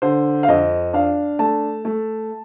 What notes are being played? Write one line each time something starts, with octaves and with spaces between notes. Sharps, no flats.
D3 C5
F5
F2 D#5
D4 F5
A3 A5
A3